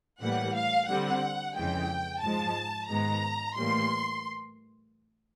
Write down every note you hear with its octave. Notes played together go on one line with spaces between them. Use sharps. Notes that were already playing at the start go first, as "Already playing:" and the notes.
A2 E3 G3 A#3 F#5
F5
D3 G3 C4 F#5
F2 C#3 E3 G#3 G5
G#2 F3 G#3 A5
G#2 D#3 G#3 B3 A#5
A2 E3 G3 A#3 C6